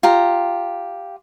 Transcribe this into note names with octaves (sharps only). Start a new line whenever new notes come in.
F4 G4 A#5